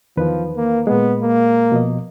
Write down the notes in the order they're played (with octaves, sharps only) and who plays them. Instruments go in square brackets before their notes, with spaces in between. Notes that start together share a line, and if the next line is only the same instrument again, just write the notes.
[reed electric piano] E2 D#3 B4 [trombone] F3
[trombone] A#3
[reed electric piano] A#2 G#3 [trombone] B3
[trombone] A#3
[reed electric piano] B2 F3 D#5